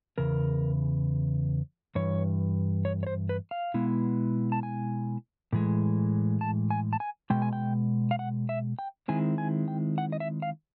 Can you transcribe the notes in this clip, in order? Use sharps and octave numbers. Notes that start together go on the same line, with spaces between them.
E2 C#3 A#4
G2 E3 C#5
C#5
C#5
C5
B4
F5
B2 G#3 B3 E4
A5
G#5
A2 E3 G#3
A5
G#5
A5
G#5
B2 G#3 G5
G#5
G5
F5
F#5
E5
G5
D#3 G#3 C4 E4 G#5
G#5
G5
F#5
D#5
E5
F5